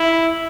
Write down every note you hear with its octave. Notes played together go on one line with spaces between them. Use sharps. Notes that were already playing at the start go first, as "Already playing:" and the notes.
Already playing: E4